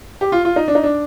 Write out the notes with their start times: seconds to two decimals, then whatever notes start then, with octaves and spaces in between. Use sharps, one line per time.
0.21 G4
0.32 F4
0.45 F4
0.56 D#4
0.68 D4
0.75 D#4
0.83 D4